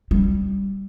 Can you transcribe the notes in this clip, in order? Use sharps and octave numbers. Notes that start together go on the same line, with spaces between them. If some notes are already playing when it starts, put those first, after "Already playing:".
G3